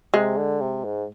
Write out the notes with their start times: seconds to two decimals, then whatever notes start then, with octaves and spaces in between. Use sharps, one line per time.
0.14 C3 G#3
0.37 D3
0.61 C3
0.84 G#2